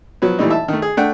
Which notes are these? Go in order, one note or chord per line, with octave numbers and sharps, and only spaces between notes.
F3 F#3 B3
A#2 E3 G3 A3 D#4
E5 A5
D#3 A3
G#4
A3 D4 F#5 G5